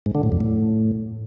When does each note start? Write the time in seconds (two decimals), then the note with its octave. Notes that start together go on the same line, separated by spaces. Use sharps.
0.06 G#2
0.15 D3
0.23 A2
0.32 F2
0.41 A2